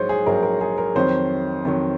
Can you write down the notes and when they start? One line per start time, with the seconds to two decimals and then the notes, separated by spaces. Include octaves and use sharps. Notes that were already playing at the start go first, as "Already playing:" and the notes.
Already playing: A#1 G#2 F#3 C5 C#5
0.09 G#4
0.26 A#1 G#2 F#3 A#4
0.43 A#4
0.61 G#4
0.78 A#4
0.95 F2 D#3 F#3 C5
1.65 F2 D#3 F#3